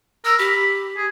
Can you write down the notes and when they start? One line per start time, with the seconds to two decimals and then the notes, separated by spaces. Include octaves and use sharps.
0.25 A#4 E6
0.39 G4 B5
0.97 G#4